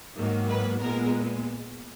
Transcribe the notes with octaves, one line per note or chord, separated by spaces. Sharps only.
G#2 D#3 F#3 A#3
B4
A#2 G#3 B3 A#4